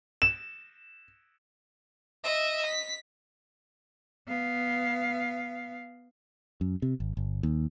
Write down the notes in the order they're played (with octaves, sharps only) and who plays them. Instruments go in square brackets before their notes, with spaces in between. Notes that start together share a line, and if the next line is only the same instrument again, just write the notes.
[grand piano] E7
[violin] D#5 E5
B6
[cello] B3 F5
[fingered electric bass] F#2
C3
G#1
G1
D#2